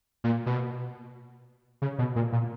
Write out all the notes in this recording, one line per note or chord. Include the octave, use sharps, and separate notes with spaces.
A#2
B2
C#3
B2
A#2
A#2